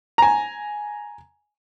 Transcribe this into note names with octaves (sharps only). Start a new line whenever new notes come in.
G#5 A#5